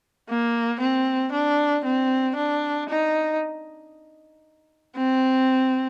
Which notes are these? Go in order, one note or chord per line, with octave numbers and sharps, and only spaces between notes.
A#3
C4
D4
C4
D4
D#4
C4